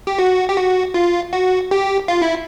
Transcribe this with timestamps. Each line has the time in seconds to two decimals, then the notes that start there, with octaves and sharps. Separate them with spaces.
0.07 G4
0.19 F#4
0.49 G4
0.57 F#4
0.94 F4
1.33 F#4
1.71 G4
2.08 F4
2.22 E4